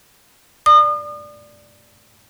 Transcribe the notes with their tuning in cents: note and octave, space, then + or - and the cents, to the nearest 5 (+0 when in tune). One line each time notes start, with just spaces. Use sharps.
D5 +0 D#6 -40